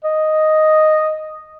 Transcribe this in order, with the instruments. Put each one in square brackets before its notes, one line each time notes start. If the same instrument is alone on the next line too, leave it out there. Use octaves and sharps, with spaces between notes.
[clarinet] D#5